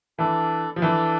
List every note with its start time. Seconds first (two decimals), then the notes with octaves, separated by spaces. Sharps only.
0.19 E3 D4 A4 D5
0.76 F3
0.82 E3 D4 A4 D5